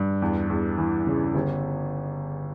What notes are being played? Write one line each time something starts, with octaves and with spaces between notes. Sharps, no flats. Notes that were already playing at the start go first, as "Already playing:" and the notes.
Already playing: G2
E2
E2
E3
C#3
G1